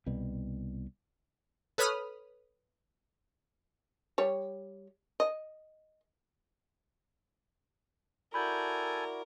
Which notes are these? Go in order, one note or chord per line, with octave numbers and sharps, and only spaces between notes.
C2 B2 G3
A4 B4 C#5 B5 D#6 F6
G3 C#5
D#5
E4 F#4 A4 A#4 D5 G#5 B5 G6